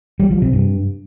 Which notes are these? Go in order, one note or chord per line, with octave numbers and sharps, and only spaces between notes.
G3
F3
C3
G2